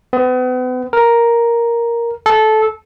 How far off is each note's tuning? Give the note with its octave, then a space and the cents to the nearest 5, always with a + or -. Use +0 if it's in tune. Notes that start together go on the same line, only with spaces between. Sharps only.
B3 +40
A#4 +5
A4 -15